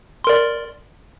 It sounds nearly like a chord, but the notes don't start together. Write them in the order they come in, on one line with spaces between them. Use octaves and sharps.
C6 A#4 D5